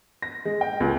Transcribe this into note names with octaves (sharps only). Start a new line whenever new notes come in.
A#6
G#3
G5
C#2